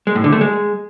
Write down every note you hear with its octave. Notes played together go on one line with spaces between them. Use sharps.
G#3
A2
D3
A3
G#3